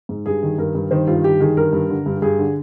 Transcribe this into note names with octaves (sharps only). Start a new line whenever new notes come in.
G#2
G2 G#4
D#3
G2 A#4
G2
D#3 C5
G2 F4
D#3 G4
D#3 G#4
G2 A#4
G2
D3
G2
G4
G2 G#4
D3